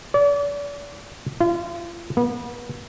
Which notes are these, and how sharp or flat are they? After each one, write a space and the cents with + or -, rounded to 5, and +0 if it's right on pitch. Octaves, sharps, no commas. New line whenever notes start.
D5 -40
F4 -35
B3 -35